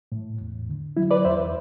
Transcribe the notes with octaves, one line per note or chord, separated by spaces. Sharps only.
A2
E2
D3
F#3 E4
B4 D5
E2 C5 E5